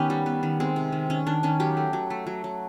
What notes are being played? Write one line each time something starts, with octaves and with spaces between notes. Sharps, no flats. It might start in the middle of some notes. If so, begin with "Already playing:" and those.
Already playing: D#3 B3 C#4 G4
G3
B3
D#3
G#3 C4
C3
D#3
D#3 C#4
D#3 D4
D#3 C#4
F#3 G4
A3
F#3
A3
F#3
F#3